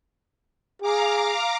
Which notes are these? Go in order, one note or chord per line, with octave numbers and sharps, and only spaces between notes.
G#4 F5 A#5 D6